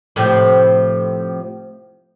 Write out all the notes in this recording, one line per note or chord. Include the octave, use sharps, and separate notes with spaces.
A2 C3 F3